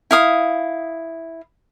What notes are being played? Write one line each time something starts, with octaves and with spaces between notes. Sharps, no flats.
E4 F5 D#6